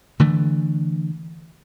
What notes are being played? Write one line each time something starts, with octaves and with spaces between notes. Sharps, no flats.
D3 E3 A3